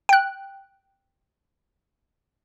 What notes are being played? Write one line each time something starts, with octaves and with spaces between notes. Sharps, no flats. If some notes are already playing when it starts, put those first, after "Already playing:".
G5 F#6